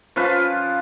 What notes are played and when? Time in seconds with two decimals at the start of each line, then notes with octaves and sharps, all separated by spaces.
0.16 F3 C#4 F4 B4